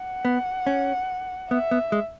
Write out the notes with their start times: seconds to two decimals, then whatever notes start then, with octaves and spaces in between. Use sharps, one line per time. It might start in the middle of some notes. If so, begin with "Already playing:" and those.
Already playing: F#5
0.25 B3
0.67 C#4
1.50 B3 E5
1.71 B3
1.92 G#3